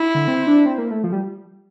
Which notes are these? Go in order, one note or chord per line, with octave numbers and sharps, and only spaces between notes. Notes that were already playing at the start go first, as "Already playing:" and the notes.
Already playing: E4
D3
C4
D4
C4
A#3
A3
F3
G3